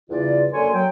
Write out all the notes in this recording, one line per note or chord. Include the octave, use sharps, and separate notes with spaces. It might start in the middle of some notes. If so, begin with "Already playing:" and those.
E2 G2 C#3 F4 D5
F#2 D3 A#3 C#5 G#5 C6
F#3 G5